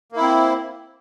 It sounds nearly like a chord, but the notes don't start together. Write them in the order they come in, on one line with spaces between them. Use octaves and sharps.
A#3 E4 C4